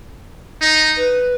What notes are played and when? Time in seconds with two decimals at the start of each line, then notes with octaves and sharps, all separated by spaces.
0.61 D#4
0.96 B4